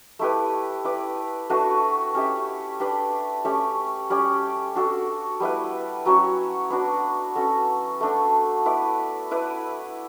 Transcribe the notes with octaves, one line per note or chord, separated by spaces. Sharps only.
A3 E4 G4 B4
E4 B4 D5
A3 D4 F#4 B4
C#4 G4 C#5 E5
D4 G4 B4 D5
A3 C#4 G4 C#5
G3 C#4 G4 D5
D4 F#4 A4
G3 B3 E4 B4
F#3 C#4 F#4 C#5
B3 D4 F#4
C#4 F#4 A4
A3 D4 A4
B3 E4 B4 D5
E4 B4 D5